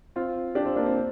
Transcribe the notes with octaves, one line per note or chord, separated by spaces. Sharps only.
C4 F4
D4 G4
C4 F4
A#3 D4
C4